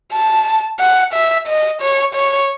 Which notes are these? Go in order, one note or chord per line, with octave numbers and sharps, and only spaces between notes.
A5
F#5
E5
D#5
C#5
C#5